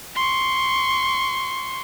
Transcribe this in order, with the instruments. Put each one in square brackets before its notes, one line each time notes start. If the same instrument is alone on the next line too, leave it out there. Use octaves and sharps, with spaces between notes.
[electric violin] C6 C#6